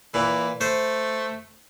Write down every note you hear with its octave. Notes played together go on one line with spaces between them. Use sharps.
A#2 E3
A3 C5